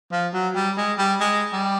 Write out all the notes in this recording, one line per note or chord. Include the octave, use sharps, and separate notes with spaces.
F3
F#3
G3
G#3
G3
G#3
G3